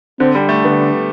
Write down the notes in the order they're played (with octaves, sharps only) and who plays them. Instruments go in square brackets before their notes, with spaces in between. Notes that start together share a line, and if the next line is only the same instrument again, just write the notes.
[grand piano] D3 [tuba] C4
[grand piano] G3
A3
[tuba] D3 [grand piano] B3